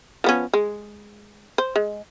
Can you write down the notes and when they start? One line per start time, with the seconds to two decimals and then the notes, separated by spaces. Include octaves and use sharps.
0.24 F3 B3 C#4
0.53 G#3
1.58 C5
1.76 G#3